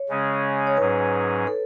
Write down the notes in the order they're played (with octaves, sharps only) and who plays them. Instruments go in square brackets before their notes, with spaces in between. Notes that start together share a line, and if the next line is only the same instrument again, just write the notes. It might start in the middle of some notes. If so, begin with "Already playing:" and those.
Already playing: [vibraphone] C#5
[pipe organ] C#3 G#3 C#4 G#4
[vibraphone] C#5
[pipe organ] G#2 F#3 C#4 G#4 [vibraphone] B4
[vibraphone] A4